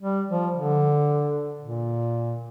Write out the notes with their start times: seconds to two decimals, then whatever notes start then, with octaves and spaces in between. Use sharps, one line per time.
0.02 G3
0.29 F3
0.56 D3
1.61 A#2